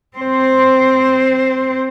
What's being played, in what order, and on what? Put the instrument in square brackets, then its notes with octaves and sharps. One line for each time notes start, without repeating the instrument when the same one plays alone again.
[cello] C4 C5